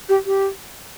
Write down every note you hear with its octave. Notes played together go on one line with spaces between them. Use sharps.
G4
G4